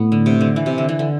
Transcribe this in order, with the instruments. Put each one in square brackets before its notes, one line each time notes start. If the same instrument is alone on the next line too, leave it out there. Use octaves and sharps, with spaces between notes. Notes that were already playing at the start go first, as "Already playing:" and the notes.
Already playing: [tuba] A2 [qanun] B3
[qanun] D3
C3
D3
E3
C3
D3
E3
D3